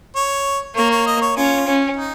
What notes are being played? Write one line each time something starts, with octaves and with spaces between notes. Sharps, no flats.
C#5
A#3 C#5
C#5
D#5
C#5
C#4 F4
C#4
D#4